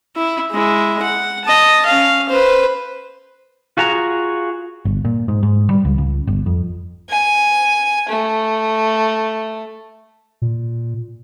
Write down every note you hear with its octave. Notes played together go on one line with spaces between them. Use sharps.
E4
G#3 E4
F#5
D#5 A5
C#4 F5
B4 C5
F4 F#4 G#4 A#5
G1
A#2
G#2
G#2
G3
C#2
C#2
G1
F2
G#5
A3
A#2